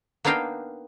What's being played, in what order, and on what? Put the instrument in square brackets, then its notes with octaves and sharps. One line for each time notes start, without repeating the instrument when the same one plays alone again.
[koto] A#3 B3 D4 D#4 F5 G5